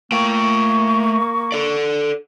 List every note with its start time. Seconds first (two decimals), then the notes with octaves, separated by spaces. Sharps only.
0.12 A3 A#3 G5 C#6
1.52 A4 D5